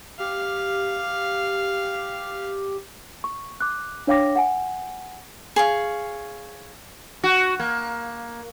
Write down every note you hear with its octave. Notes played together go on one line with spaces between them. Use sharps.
G4 F5
C#6
D6 F#6
D4 C#5 F5 G5 D6 A#6
F#5 G#5
G#4 C#5 F5
F#4
A#3